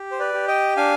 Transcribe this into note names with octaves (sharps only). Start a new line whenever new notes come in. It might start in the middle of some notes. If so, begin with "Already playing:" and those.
Already playing: G4
C5
B4 D5
G4
D#5 G5
D4 F5 G#5